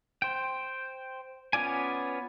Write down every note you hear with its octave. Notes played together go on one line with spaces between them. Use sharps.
C5 G5
B3 C#4 F4 D5 G#5